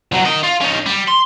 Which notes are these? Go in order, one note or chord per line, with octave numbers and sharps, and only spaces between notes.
C2 F#3
A#4 D#5
F4
C#4 D#4
G3
C6